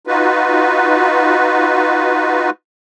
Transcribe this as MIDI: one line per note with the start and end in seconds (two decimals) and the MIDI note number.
0.07 2.50 63
0.07 2.50 65
0.07 2.50 66
0.07 2.50 71